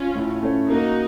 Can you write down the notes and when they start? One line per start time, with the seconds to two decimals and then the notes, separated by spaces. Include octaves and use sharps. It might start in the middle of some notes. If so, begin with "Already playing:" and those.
Already playing: C#4 F4
0.16 A2
0.43 A3 C#4
0.69 A#3 D#4 F#4